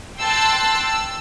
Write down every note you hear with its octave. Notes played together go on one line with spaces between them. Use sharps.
G5 A5 C6 E6 F#6 A6
E6